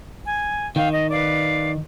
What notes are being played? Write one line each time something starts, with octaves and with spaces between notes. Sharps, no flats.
G#5
D#3 F5 G5
D#5
B4 D5 F5